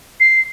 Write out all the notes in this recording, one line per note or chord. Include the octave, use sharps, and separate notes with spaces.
C7